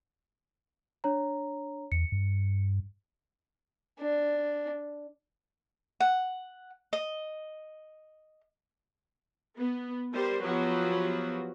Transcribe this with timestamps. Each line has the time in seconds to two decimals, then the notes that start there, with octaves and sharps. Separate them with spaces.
1.04 D4 C#5 A#5
1.92 E2 C#7
2.12 G2
4.00 D4
6.00 F#5
6.93 D#5
9.58 B3
10.13 G3 A#4 C5
10.43 F3 F#3 B3 F#4 G4 B4